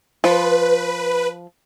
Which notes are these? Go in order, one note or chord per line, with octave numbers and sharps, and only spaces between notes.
F3 B4